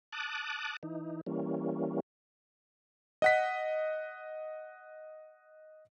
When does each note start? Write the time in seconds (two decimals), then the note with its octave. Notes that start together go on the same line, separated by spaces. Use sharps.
0.13 A5 D6 D#6 F#6
0.83 E3 D#4
1.26 E3 G3 A#3 C#4
3.22 D#5 F#5 B6